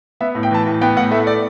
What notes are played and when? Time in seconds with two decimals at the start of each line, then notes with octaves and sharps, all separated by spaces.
0.21 B3 E5
0.35 A2
0.43 G5
0.51 E3 A5
0.66 A2
0.81 B3 G5
0.96 A2 F#5
1.11 A3 E5
1.27 D5